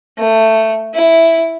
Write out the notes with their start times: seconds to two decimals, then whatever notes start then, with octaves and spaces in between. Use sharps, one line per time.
0.18 A3
0.94 E4